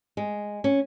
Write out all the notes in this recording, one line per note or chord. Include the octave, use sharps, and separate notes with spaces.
G#3
C#4